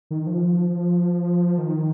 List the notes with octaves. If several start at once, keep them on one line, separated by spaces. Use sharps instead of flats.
D#3
F3
D#3